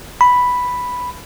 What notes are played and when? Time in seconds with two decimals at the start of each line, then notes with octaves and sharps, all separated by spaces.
0.21 B5